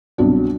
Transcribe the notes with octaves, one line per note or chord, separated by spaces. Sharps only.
C2 B2 F#3 D4